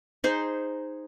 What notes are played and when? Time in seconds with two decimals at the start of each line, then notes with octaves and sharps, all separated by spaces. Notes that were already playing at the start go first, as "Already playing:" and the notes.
0.24 D#4 G#4 C5